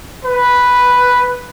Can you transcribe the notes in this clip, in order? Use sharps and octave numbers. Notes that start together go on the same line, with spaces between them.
B4